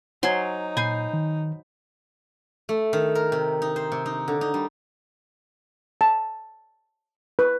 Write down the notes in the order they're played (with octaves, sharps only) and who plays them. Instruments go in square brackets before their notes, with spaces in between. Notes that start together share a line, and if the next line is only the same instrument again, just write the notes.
[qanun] F#3 C6 [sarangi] D#4 [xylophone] C5 G#5 G#6
[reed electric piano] A#2 [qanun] G#5 [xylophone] B5 G6 C7
[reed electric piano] D#3
[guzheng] A3
D#3
A#4
C3
D#4
C5
C3
D#4
D3
D#4
G3
[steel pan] A5
B4